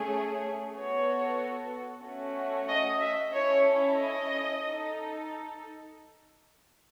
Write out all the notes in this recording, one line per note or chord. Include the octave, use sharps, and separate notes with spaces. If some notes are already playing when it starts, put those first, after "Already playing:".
Already playing: A3 C#4 G#4
B3 F#4 A4 C#5
A3 C#4 F#4
D#5
E5
C#4 E4 A4 C#5
D#5
D#4 A4